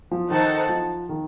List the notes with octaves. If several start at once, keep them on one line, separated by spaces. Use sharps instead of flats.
F3
D#3 D#4 A4 C5 F#5 A5
F3
D#3